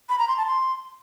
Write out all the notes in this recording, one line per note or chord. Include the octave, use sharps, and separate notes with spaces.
B5
A#5
C6
A5
C6